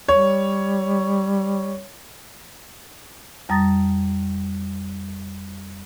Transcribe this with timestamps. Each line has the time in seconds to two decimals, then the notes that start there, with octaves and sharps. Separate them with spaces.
0.08 G3 C#5
3.49 F2 G3 A#5 D#6 A6 A#6